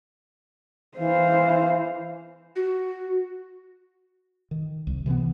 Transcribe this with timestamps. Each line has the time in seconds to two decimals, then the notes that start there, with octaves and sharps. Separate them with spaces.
0.98 E3 C5 F5
2.56 F#4
4.51 D#3
4.87 C2
5.06 C3 E3 F3 B3